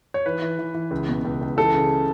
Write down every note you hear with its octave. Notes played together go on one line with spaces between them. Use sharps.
C#5
E3 B4
E3
E3
E3
C#2
B2
C#2
C#2
E3 A4
C#3